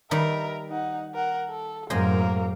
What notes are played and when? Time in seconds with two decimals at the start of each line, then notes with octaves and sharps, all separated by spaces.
0.11 D#3 G3 A#4 B4 E5
0.69 D#4 F#5
1.14 A#4 F#5
1.50 A4
1.90 F#2 A2 G#3 A#3 A#4 C5 D#5